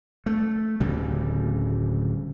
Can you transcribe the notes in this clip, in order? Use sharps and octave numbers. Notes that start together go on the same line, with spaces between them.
A3
D1 D2 C#3 G3